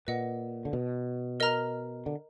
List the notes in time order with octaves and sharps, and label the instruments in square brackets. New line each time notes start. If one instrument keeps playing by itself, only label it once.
[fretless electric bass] A#2 [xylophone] B4 D#5 F#5
[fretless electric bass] D3
B2
[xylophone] A#4 D#5 A#5 F6
[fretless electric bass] D3